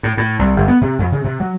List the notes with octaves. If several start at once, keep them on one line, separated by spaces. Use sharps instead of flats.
A2
A2
C2
G1
B3
C3
F2
C#3
C3
F#3